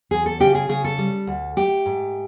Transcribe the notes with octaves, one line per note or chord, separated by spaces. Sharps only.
E2 G#4
A4
C#3 G4
G#4
C#3 G#4
A4
G3
D2
A3 G4
G#2